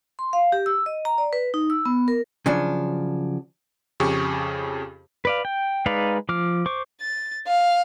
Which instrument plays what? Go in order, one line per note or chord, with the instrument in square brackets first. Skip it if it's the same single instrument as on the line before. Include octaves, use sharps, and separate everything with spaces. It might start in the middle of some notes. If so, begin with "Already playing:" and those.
[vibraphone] C6
F5
G4
E6
D#5
A#5
D5
B4
D#4
E6
B3
A#4
[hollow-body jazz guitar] C#3 F3 F#3 D4
[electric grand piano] F2 C#3 G4 G#4 C#6
[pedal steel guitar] B4 D5 F5
G5
G#3 D#4 B4 D5 F5
F3 D6 F6
C5 C#6 D6
[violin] A6
F5